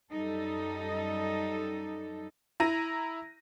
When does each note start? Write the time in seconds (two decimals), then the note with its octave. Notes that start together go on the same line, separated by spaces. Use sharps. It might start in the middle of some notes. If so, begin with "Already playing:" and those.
0.13 F#2 G3 D#4 A4
2.60 E4 A#5 A#6 D#7